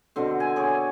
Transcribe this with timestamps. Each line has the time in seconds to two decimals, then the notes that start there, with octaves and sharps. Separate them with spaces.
0.16 B2 D3 C4
0.40 G#5
0.56 G#4 C#5 D5